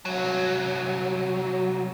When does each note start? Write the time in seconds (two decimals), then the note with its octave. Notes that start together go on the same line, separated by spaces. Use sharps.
0.05 C2 F#3